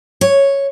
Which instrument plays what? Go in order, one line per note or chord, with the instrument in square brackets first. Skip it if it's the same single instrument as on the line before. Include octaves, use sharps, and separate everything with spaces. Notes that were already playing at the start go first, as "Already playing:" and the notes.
[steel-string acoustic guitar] C#5